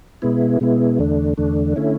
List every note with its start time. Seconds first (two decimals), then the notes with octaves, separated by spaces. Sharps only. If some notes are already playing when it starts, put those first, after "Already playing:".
0.22 B2 G#3 B3 E4
0.61 B2 G#3 B3 E4
0.99 E2 D3 A3 D4
1.37 E2 D3 A3 D4
1.76 D3 A3 C#4 E4